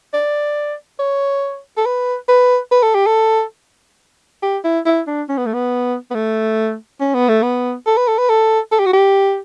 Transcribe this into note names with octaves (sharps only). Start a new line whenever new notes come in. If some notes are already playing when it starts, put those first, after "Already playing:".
D5
C#5
A4
B4
B4
B4
A4
G4
A4
G4
E4
E4
D4
C#4
B3
A3
B3
B3
A3
C#4
B3
A3
B3
A4
B4
A4
B4
A4
A4
G4
F#4
G4